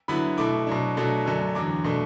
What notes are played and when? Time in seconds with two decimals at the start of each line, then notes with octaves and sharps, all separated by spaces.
0.08 D3 F#3 B3 E4 B5
0.37 B2 A3 E4 D6
0.67 B2 F#3 D4
0.97 B2 F#3 A3 D4
1.26 F#2 D3 F#3 A3 D4
1.55 E2 D3 F#3 D6
1.84 B2 A3 D4